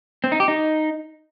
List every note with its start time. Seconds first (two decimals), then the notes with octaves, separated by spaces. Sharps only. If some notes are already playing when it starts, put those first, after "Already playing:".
0.24 C4
0.32 D#4
0.40 G4
0.48 D#4